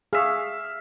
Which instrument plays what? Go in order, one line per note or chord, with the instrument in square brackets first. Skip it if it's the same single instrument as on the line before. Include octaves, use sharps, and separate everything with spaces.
[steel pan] G#4 C#6 [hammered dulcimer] E5 F5